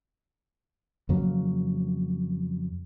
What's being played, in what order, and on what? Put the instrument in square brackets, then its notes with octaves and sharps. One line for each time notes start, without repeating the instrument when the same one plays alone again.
[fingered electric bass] F2 C#3 F#3 A#3